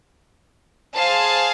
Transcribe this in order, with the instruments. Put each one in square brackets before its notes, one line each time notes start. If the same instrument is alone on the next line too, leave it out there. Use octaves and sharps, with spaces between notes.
[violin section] G#4 C5 F5 A5